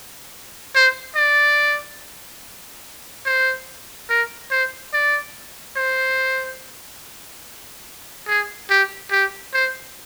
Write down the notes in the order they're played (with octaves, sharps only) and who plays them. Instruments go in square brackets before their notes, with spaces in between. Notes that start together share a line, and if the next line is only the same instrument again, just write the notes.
[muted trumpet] C5
D5
C5
A#4
C5
D5
C5
G#4
G4
G4
C5